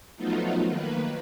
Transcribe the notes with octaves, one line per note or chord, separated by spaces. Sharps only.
F3 F#3 A3 B3 D#4 F4
D#3 A#3 B4